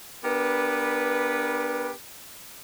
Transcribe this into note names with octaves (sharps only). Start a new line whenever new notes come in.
B3 D4 G4 A#4 B4